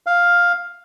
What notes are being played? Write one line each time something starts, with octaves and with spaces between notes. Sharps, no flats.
F5